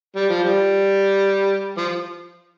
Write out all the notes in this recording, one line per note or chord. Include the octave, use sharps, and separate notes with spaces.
G3
F3
G3
F3